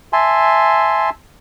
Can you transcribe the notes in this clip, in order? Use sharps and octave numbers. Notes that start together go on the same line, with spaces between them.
E5 G#5 A5 C6